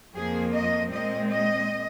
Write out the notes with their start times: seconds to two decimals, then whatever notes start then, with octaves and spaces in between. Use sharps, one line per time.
0.15 F2 F3 A#3 G#4
0.53 D#5
0.91 A#2 G#3 C4 D#5
1.30 D#5